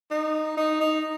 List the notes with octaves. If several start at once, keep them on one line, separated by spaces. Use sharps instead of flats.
D#4
D#4
D#4